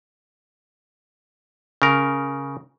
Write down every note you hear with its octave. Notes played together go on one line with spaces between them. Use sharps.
C#3 A#4